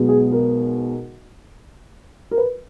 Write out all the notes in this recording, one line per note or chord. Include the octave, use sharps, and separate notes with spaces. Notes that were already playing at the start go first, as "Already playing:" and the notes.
Already playing: B1 B2 G#3 B3
G#4
A#4
A#4
B4